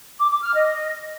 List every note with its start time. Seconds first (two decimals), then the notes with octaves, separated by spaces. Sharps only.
0.18 D6
0.30 D6
0.42 F6
0.54 D#5